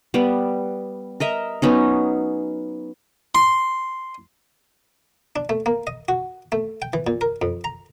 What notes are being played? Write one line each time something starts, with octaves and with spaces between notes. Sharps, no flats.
G3 B3
A#4 D#5 E5
F#3 B3 C#4 D#4
C6
D4
A3
A#3
D#5
F#4
A3
G5
E3
A#2
A#4
F2
A#5